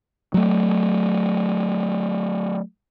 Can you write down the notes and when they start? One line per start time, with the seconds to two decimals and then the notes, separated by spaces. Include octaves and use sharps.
0.34 F#3 A3